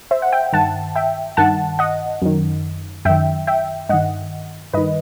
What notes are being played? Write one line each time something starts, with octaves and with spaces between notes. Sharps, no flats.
C5 E5
F#5
E5 G5
G2 D#3 F#5 A5
E5 G5
G2 D#3 F#5 A5
D#5 F#5
F#2 D#3
F#2 D#3 E5 G5
E5 G5
G2 D#3 D#5 F#5
G2 D#3 B4 D#5